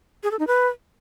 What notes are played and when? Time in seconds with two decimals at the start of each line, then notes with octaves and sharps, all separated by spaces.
0.23 G#4
0.31 A4
0.39 D#4
0.47 B4